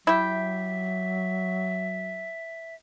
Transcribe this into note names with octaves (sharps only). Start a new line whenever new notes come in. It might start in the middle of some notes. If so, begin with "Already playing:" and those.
F#3 E4 G4 E5